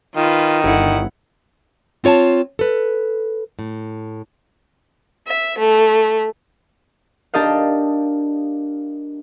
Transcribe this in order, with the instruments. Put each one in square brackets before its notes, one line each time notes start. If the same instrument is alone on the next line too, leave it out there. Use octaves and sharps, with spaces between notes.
[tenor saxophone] D#3 [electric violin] F4 B4
[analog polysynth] G1 [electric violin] E4 F#5
[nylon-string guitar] C4 F4 C#5 G#5 A5
A4 B4
A2
[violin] E5
A3
[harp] D4 G4 A#4 D#5 F5